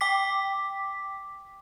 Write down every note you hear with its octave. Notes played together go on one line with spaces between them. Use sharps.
G5 D6 B6